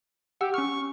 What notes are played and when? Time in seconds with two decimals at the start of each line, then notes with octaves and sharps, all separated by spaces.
0.41 G4 F#5 E6
0.54 C#4 C#6 F6